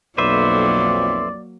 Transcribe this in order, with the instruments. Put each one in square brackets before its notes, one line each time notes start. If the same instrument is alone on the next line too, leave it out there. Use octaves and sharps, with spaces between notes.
[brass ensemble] B1 F2 [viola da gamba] F#3 A#3 [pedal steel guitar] B4 C5 E5 [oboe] D5